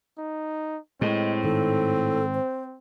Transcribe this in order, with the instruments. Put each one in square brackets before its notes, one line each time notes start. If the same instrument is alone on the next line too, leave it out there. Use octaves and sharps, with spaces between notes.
[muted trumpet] D#4
[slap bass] A2 [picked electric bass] G#3 [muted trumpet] C4 [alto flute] D#5
[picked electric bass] G#2 D#3 [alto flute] A4
[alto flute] C5